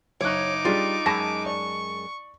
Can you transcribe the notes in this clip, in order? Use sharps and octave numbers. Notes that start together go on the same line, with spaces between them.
F#1 D#4 C#5 D6 F#6
G3 D4 F4 G#4
F#2 G#3 A5 B5 C#6 A#6
D5 C#6